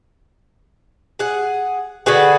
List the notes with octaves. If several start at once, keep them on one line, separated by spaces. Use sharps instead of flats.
G#4 F#5
D3 F#4 G#4 B4